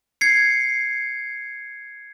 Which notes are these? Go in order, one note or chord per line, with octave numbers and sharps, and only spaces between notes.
G#6 C7 C#7